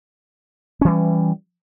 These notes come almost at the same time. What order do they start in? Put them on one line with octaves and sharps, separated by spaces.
C#4 E3 G3